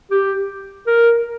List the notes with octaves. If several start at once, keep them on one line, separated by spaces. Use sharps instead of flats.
G4
A#4